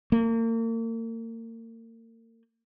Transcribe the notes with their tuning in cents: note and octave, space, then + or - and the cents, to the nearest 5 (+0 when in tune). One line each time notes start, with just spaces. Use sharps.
A#3 -40